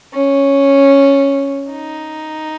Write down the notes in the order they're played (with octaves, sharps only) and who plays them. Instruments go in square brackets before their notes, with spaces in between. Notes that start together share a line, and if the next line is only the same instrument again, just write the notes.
[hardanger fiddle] C#4
D#4